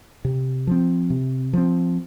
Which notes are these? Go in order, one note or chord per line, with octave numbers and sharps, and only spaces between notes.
C3
F3 C4
C3
F3 C4